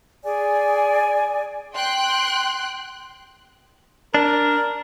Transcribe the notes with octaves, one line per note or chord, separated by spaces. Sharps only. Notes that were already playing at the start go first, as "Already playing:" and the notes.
G#4 D5 G#5
G5 C6 F#6
D4 A#4